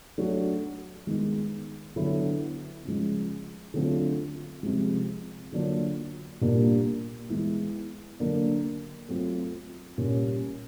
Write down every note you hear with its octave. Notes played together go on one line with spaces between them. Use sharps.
F#3 A3 D4 F#4
D#3 G#3 B3
D3 F#3 B3 E4
C#3 F3 G#3
D3 F#3 A3 C4 F4
C3 F3 G#3
D3 F#3 A#3 D4 F4
A#2 G3 A#3 D4
E3 G#3 B3 E4
D3 F#3 A#3 D4
F#3 A3 C4 F4
A#2 G3 A#3 C#4